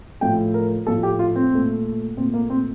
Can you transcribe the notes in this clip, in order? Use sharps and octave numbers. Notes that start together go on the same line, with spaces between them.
A2 F3 A3 G5
A#4
A2 F3 A3 A4
G4
F4
C4
A#2 A3
A#2 A3 C4
A#3
C4